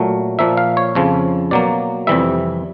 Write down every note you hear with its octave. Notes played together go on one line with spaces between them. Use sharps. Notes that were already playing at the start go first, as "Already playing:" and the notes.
Already playing: A#2 F#3 A3
A#2 F3 A#3 E5
F5
C#5
F2 C#3 F3
B2 F#3 A#3 D5
F2 C3 E3 G3 E5